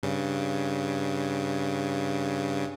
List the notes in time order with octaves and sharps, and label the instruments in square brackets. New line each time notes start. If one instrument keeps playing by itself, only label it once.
[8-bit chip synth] G2 C#3